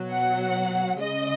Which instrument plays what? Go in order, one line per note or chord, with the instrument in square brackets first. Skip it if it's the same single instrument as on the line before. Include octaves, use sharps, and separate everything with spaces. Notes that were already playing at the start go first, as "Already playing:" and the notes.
Already playing: [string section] B2 F#3
F#5
C#3 G#3 D#5